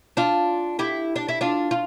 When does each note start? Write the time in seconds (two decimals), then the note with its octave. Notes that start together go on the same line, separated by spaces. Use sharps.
0.17 D4 F4
0.79 E4 G4
1.16 D4
1.29 E4
1.41 D4 F4
1.71 F4